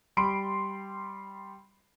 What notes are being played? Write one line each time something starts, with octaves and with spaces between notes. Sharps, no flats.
G3 B5 C6 D7